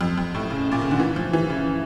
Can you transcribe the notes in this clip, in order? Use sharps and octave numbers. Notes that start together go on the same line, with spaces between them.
F2
F2
A2
C#3
A#2
C#3
D3
E3
F3
E3
C#3